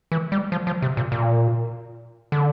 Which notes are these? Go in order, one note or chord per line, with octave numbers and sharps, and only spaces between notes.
E3
G3
F3
F3
C3
A#2
A#2
D3